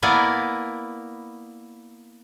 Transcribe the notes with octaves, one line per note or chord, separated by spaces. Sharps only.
A#3 B3 E4 A#4 D5 G#5